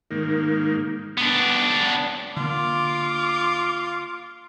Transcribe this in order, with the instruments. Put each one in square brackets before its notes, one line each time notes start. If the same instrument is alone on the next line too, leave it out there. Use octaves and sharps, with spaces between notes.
[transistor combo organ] G#2 D#3 A#3
[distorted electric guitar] B3 D4
[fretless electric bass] D3 A#3 [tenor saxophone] F4 [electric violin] D6